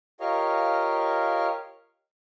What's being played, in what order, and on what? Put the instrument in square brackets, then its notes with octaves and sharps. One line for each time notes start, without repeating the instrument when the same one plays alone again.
[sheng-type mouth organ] F4 G4 A#4 C#5 D#5 F5